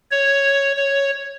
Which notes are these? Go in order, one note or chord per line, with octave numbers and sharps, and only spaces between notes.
C#5
C#5